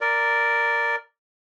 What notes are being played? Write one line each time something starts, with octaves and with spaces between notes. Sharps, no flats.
A#4 D5